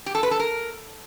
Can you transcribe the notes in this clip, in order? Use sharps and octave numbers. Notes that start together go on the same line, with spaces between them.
G4
A4
B4
A4
A#4